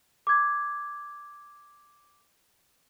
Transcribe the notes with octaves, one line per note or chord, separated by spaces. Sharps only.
D6 G#6